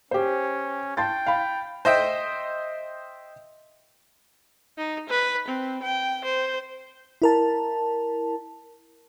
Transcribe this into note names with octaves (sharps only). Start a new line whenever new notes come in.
C#4 G4 C5
G5 A5 C6 A6
F5 B5
C5 D#5 E5 G5
D#4
B4
C4
G5
C5
E4 A#4 A5